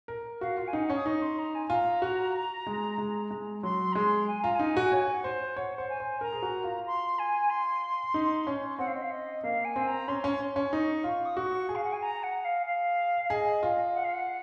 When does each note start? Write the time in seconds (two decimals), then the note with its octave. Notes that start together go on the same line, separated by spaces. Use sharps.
0.08 A#4
0.41 F#4 F5
0.57 F4
0.67 G#5
0.73 D#4 F#5
0.90 C#4
0.95 D#6
1.06 D#4 C#6
1.21 C6
1.38 A#5
1.54 G#5
1.70 F4 A#5
2.02 F#4
2.67 G#3
2.98 G#3
3.31 G#3
3.63 F#3 C6
3.92 A#5
3.95 G#3 C6
4.27 G#5
4.42 F4 A#5
4.55 D#4 G#5
4.77 F#4
4.92 C#5 G#5
5.13 F#5
5.24 C5
5.56 C#5 F#5
5.78 C5
5.89 G#5
6.00 C5
6.21 A#4 A#5
6.32 G#4
6.43 F#4
6.64 F4
6.86 C6
7.18 G#5
7.49 C6
8.14 D#4
8.47 C#4
8.78 C4 F#5
8.87 F5
8.94 D#5
9.02 F5
9.10 D#5
9.43 A#3 F5
9.64 G#5
9.76 C4
9.87 A#5
10.08 C#4 C6
10.24 C#4
10.56 C#4
10.73 D#4 C#6
11.04 F4
11.25 D#6
11.36 F#4 C#6
11.69 G#4
11.75 F5
11.83 F#5
11.92 G#5
12.02 A#5
12.23 F#5
12.44 F5
12.66 F5
13.24 F5
13.29 G#4 D#5
13.63 F4
13.94 F#5
14.04 F5
14.13 F#5